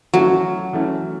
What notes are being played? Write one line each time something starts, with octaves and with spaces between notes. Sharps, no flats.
E3 F#3 A3 C#4
E3 A3 C#4